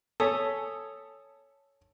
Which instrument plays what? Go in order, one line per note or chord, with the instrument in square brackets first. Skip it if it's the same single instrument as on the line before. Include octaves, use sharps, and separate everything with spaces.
[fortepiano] A4 C#5 [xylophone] G#5 D#6 B6